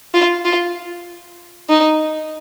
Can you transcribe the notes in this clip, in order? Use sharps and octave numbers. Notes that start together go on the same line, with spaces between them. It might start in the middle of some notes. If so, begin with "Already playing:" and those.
F4
F4
D#4